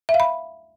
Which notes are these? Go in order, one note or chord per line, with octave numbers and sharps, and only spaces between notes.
E5
F5
B5